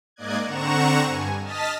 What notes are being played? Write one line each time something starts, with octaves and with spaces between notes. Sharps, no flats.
G#2 A#3 D5 D#5 F#6 G#6
D3 C4 F#5 A#5 C#6 E7
G2 G#5
D#5 A5 D#6 F6 A6 B6